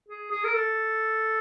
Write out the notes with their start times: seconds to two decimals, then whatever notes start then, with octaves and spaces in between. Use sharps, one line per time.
0.08 G#4
0.31 G#4
0.44 A#4
0.54 A4